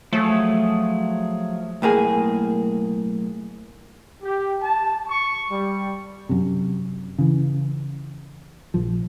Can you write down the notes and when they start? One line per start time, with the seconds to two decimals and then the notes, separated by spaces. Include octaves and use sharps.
0.13 F3 F#3 A3 G#4
1.82 B1 A2 A#3 G#4
4.22 G4
4.62 A5
5.08 C#6
5.51 G3
6.29 F#2 C3
7.19 C#3 E3
8.74 A#1 F3